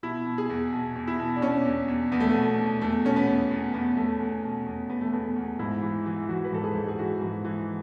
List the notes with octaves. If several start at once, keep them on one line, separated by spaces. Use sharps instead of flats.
B2 E4
B2
G#4
E2
B2
E2
E4
B2
D4
B2 C#4
E2
E2
E2 B3
A3
B3
B2
B2
E2 A3
B2 C#4
B3
E2
E2
E2 B3
E2 A3
E2
B2
E2
E2 B3
A3
E2 B3
E2
G#2 E4
E3
E3
E3 F#4
B4
G#2 A4
G#4
G#2
G#4
E3 F#4
G#2
E3